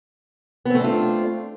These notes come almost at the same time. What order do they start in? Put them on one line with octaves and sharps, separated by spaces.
B3 C4 A3 D4 F4